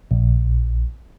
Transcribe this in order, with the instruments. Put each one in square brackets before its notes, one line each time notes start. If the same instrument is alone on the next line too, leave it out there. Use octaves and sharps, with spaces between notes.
[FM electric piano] A#1